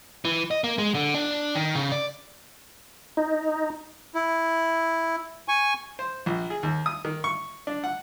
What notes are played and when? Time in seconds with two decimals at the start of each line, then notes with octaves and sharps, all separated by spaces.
0.25 E3
0.51 D#5
0.64 A#3
0.78 G#3
0.95 D3
1.15 D4
1.55 D#3
1.76 C#3
1.92 D5
3.17 D#4
4.15 E4
5.48 G#5 C#6
5.99 C5
6.26 A#1
6.50 G#4
6.63 D#2
6.86 D#6
7.05 D#3
7.24 C#6
7.67 D4
7.84 F#5